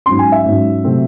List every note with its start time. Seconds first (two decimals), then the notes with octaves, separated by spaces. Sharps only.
0.06 G#2 F#3 C#4 C6
0.19 G#5
0.32 E5
0.45 G#2 F#3 C#4
0.84 C3 F#3 A3 C4